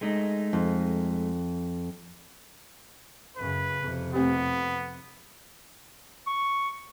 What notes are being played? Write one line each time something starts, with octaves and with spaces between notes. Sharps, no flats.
G#3 A3 D#4
F2
F#2 C#3 B4
F2 C3
A3 B3 C4 G4
C#6